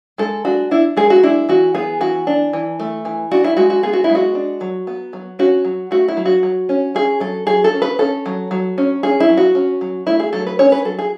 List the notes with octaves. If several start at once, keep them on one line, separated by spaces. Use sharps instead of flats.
G#3 A4
D4 F#4
D4 E4
G#3 G#4
F#4
D4 E4
E3 F#4
B3 G#4
E3 F#4
D4
E3
A3
E3
D4 F#4
E4
G#3 F#4
F#4
B3 G#4
F#4
E4
G#3
F#4
D4
F#3
B3
F#3
C#4 F#4
F#3
A3 F#4
E4
F#3
F#4
F#3
C#4
C#4 G#4
F#3 A4
F#3 G#4
A4
C#4
B4
C#4 A4
F#3
F#3
C#4
C#4 G#4
E4
F#3
F#4
C#4
F#3
A3 E4
G#4
F#3 A4
B4
C#4 C#5
B4
F#3 A4
G#4